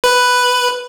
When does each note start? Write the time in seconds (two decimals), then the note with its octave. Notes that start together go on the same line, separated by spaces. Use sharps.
0.04 B4